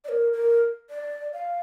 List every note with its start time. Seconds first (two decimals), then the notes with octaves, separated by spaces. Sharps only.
0.04 D5
0.09 A#4
0.33 A#4
0.90 D5
1.33 F5